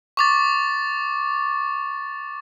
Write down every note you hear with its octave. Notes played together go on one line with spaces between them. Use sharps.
C#6 D6 A6